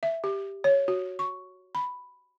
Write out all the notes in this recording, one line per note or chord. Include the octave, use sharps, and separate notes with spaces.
E5
G4
C#5
F#4
C#6
B5